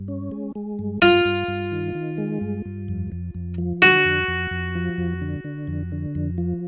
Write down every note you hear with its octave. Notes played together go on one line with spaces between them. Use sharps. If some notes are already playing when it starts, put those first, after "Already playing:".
Already playing: G2
C#4
G#3
G#3
G2
G2 F4
G2
G2
D#3
D#3
G#3
G2
G2
F2
F2
F2
F3
D3 F#4
F2
F2
F2
F3
F2
D3
D3
F2
D3
F2
F3